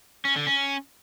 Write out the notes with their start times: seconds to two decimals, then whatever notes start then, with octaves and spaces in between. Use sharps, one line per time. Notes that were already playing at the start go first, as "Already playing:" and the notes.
0.25 C#4
0.36 D3
0.47 C#4